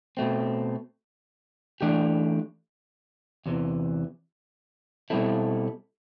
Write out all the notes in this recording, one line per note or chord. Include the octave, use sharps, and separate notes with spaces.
B2 A3 C4
E3 A3 D4 G4
E2 C3 E3
B2 G3 C4 E4 A4